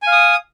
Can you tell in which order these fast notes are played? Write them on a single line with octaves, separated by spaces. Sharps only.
G#5 F5 D#6